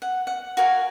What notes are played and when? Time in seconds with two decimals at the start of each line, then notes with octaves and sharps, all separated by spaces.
0.02 F#5
0.27 F#5
0.57 F#4 A#4 F5 G#5